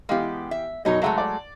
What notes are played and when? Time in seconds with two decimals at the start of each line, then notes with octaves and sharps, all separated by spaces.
0.09 E3 G#3 B3 G4 F5
0.51 E5
0.85 F#2 B2 F#3 D#4 C#5 D#5
1.02 F#3 G#3 A3 E5 F#5 A#5
1.18 D5